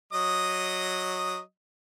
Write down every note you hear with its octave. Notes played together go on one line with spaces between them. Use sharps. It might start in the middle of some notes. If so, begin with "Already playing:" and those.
F#3 D#5 D#6